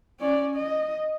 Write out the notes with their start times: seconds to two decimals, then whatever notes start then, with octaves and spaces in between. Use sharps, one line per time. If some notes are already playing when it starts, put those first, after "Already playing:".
0.20 C#4 D5
0.56 D#5